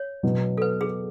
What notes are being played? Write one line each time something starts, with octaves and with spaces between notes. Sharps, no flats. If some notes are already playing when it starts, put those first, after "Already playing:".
Already playing: C#5
B2 F#3 B3
A4
B4
G#4